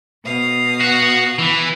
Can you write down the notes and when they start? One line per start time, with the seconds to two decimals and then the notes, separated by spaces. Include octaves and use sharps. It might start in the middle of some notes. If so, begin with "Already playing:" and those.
0.22 B2 F5 D#6
0.81 F#4
1.39 E3